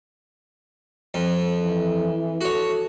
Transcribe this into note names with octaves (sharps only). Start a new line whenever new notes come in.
F2
E3
F#4 A4 C#5